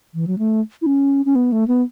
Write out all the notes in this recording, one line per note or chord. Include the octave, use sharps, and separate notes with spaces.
E3
F#3
A3
E4
C#4
C#4
B3
A3
B3